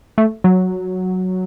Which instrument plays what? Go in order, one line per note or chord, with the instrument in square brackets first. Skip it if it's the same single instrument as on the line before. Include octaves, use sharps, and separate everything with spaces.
[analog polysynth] A3
F#3